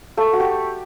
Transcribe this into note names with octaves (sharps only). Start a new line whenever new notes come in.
A3 A4
F#4
G4